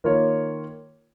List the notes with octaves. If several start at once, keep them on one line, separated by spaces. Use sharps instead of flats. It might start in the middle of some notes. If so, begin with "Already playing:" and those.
D#3 A#3 F4 C#5